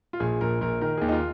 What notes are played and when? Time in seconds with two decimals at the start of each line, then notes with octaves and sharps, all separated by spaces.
0.13 F4
0.20 A#1 G#4
0.41 A#1 A#4
0.61 A#1 A#4
0.81 D#3 A#4
0.97 D#2 G#4
1.09 D#4
1.12 F4